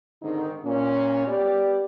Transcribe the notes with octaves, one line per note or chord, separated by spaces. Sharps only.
G#2 D3 D#3 C4 D#4
A#2 C#4
B3 G4 D5